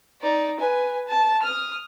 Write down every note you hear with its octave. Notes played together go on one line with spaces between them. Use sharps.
D#4 D5
B4 G#5
A5
D#6 F6